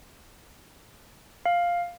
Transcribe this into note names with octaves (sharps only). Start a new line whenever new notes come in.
F5